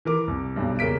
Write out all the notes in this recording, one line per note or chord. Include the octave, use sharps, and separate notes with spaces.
E3 A#4 D6
C2
B1 G2
E1 C#3 A#3 B6 D7